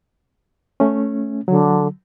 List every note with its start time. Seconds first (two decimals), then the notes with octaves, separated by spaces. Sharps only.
0.80 A3 C#4
1.48 D3 F#3